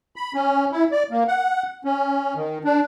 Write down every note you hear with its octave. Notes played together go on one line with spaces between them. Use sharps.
B5
C#4
E4
D5
A#3
F#5
C#4
D#3
D4